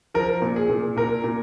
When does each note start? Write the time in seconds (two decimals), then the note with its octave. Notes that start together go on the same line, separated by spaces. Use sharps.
0.15 F3 A#4
0.42 A#2
0.56 G#4
0.69 A#2
0.96 A#2 A#4
1.24 A#2